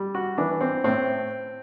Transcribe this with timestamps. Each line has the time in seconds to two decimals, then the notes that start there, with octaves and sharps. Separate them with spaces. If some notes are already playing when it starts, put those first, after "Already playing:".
Already playing: G3
0.15 F#4
0.38 E3 D4
0.61 C4
0.84 A2 C4